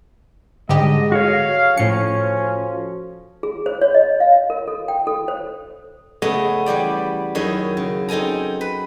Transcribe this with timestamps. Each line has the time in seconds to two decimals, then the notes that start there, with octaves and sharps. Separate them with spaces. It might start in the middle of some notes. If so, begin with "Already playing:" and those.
0.69 G#2 D3 G3 G#3 G4 D#5
1.12 F#4 A4 C#5 F5
1.77 A2 F3 C#4 C#7
3.43 G#4
3.66 C5
3.81 C#5
3.94 D#5
4.20 F5
4.50 A#4
4.67 A4
4.88 G5
5.07 A4
5.28 C5
6.22 C#3 A3 B3 G#4 D#5 A#5
6.66 E3 G3 G4 D5
7.35 F#2 D#3 E4 G#4 C#5 D#5
7.77 C#3
8.09 C4 D#4 A4 G#5 A#5
8.61 B4